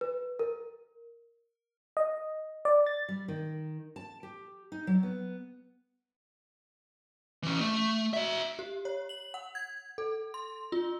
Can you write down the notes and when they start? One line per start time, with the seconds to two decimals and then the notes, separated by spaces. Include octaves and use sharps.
0.01 B4
0.39 A#4
1.97 D#5
2.65 D5
2.86 A6
3.09 G3
3.28 D#3
3.96 A5
4.23 G4
4.72 D#4
4.87 F#3
5.03 B3
7.43 E3 C#4
7.60 A3
8.13 F#4 E5
8.59 G4
8.85 C#5
9.09 F#7
9.34 F#5
9.55 G#6
9.98 A4
10.34 C6
10.72 F4